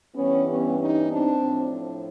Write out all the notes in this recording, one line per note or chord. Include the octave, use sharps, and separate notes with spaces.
G2 E3 G3 B3 C#4
B3 C#4
C#4 D#4
C4 D4
A2 F3